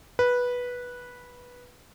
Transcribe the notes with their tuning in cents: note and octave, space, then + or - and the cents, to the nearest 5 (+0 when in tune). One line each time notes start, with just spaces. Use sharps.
B4 -10